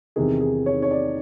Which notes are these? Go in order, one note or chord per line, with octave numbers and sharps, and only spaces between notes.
E2 C3 D#3 G#4
G#4
C#5
C#5
D5